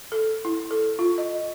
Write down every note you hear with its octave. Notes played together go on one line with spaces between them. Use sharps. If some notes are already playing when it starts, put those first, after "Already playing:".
A4
E4
A4
F4
D#5